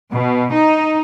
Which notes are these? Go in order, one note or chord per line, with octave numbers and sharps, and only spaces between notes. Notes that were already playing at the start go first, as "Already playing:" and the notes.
B2
D#4